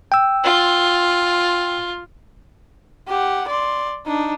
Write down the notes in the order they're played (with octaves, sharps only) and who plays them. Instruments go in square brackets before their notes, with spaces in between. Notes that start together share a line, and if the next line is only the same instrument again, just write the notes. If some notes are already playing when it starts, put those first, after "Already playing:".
[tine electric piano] G5 E6
[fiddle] F4
[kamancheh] G4 F#5
D5 C6
D4 D#4